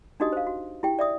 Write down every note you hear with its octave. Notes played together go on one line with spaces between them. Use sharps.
D4 D#4 F#4 G4 D#5 D#6
C5 F5
F#4
E4 G4 G5
D5 E5 D#6